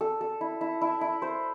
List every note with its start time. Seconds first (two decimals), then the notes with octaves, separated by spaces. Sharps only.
0.01 A4
0.21 A4
0.41 E4
0.61 E4
0.81 E4
1.01 E4
1.22 C5